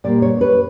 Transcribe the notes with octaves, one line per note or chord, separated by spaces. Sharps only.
A#2 G3 A#3 D5
C#5
B4